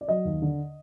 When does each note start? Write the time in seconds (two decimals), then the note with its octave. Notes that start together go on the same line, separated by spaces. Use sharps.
0.01 D5
0.08 F#3 D#5
0.25 D#2
0.42 D3